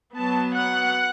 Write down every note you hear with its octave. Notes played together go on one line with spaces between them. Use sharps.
F#3 B3 A5
F#5